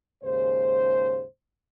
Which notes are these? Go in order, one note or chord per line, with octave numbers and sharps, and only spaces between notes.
D#2 G#2 C#3 C5